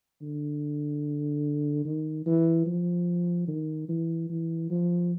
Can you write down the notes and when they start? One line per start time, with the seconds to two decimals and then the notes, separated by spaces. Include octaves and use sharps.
0.21 D3
1.85 D#3
2.26 E3
2.66 F3
3.48 D#3
3.89 E3
4.29 E3
4.70 F3